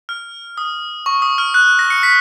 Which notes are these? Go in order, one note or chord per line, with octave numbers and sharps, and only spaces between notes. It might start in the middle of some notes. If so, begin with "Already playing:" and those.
F6
D#6
C#6
D#6
F6
F#6
A#6
C#7
B6